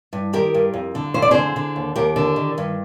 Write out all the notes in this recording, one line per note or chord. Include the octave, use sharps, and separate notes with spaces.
G2
D#3 G4 A#4
G2
F2
D3
F2 C5
D5
D3 G#4 C5
D3
D#2
D#2 G4 A#4
D3
D#3
G2